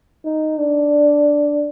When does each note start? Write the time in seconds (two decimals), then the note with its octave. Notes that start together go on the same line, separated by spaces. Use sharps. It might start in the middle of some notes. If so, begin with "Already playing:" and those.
0.25 D#4
0.58 D4